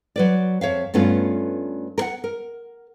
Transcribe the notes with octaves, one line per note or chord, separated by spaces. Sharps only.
F#3 B4 D5
F2 C#5 E5 F5
G2 A3 B3 C#4 F4
A#4 F#5
A#4